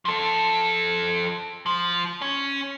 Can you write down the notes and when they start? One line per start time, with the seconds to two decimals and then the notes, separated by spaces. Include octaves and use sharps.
0.05 F3 A4
1.66 F3
2.22 C#4